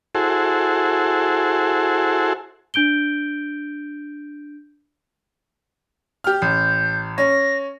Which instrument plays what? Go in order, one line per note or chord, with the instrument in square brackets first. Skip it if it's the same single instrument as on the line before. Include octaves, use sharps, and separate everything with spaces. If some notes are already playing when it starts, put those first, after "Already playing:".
[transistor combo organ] E4 F#4 G#4 A4 C5
[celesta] D4 G6 D7 G7
[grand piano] G4 F6
[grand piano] A1 [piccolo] G6
[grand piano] C#4 [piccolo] A#6